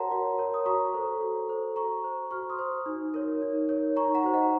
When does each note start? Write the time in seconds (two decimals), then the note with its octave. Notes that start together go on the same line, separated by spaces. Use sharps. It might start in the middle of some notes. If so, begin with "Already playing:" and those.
Already playing: F#4 A#4 C#5 F#5 A5 A#5 C6
0.11 F#4
0.38 A#4 C#5
0.54 D#6
0.66 F#4 A#5 C#6
0.94 A4 C5
1.21 F#4
1.49 A4 C5
1.76 F#4 A#5 C#6
2.04 C5
2.31 F#4 C#6 F6
2.49 C6 D#6
2.59 C5
2.86 D#4
3.14 A#4 C#5
3.42 D#4
3.69 A#4 C#5
3.96 D#4 A#5 C#6
4.14 F#5 A#5
4.23 F#4 C5
4.33 D#5 F#5